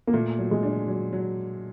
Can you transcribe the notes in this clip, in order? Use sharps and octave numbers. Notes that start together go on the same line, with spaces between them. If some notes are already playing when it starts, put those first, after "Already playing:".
A#3
A#2 A3
F#3
G#3
D4
F#3
F#3